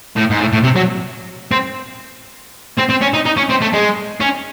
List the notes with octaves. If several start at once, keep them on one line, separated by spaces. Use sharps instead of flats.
A2
G#2
A2
A2
C3
F#3
C4
C4
C4
C#4
D#4
D#4
C#4
C4
A3
G#3
C#4